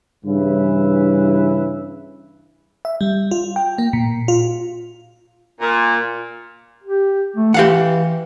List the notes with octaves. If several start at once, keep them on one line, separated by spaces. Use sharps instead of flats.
G2 C#3 E3 E4 B4
E5
G3
F4
G5
A#3
A#2
F4
A#2
G4
A3
E3 G4 F5 F#5